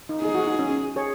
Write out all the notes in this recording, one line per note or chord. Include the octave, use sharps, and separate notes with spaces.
D#4
D#4 G#4
F#4
D#4
C#4
G#4 C#5